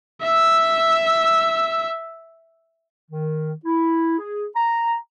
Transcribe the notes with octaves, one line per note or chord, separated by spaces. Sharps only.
E5 E6
D#3
E4
G#4
A#5